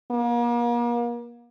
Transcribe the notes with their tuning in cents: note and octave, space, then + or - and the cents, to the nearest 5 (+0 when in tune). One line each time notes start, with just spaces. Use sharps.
A#3 +40